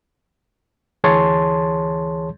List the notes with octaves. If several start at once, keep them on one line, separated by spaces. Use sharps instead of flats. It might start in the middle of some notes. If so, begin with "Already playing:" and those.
D2 E3 G#4 C#5 A5 C6